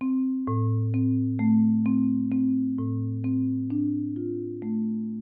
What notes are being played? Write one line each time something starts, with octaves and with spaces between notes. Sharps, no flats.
C4
A2
C4
A3
C4
C4
A2
C4
D4
F4
A3